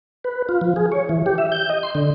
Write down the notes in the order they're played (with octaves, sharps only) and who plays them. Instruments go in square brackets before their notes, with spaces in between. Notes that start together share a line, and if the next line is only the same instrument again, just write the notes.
[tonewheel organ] B4
F4
F3
G#4
C#5
E3
G4
E5
G6
D#5
C6
D3